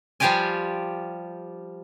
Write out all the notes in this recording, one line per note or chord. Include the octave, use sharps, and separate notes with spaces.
F3 G3 F4 G4 D5 G#5